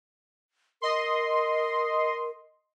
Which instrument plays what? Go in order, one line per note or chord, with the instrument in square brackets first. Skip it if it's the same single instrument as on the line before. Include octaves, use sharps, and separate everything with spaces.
[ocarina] A#4 [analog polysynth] D#5 C6